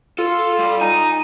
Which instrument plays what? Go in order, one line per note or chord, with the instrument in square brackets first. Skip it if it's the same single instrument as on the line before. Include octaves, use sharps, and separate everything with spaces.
[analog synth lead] F4 [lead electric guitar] A4
[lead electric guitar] G3
[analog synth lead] D#4 [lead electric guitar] G#5